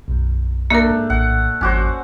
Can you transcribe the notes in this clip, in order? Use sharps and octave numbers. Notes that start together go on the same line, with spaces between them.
B1 F#2
A3 A#3 D4 A#4
G#2
A#1 A2 F#5
G#1 F2 C#4 F#4 C5 D6